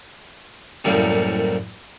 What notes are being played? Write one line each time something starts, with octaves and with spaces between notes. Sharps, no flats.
C2 F#2 A2 G3 A#3